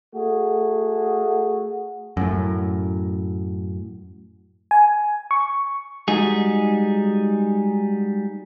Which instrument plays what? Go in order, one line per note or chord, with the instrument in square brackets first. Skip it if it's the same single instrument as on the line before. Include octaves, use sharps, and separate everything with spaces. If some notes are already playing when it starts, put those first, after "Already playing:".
[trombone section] A3 F#4 G#4
[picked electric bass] F#2 A2
[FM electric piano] G#5
C#6
[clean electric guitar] G3 G#3 D#4 F#4 G#4